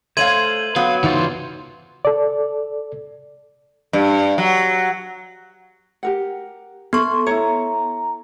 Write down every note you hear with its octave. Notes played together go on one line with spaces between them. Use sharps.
A3 C5 C#5 F5 G#6 D#7 F#7
F#3 B3 F5
C#2 E3 D#4 F4 C5
A4 D5
G2
F#3
G4 A#4 F#5
B3 A4 C6 C#6
E4 C#5 A#5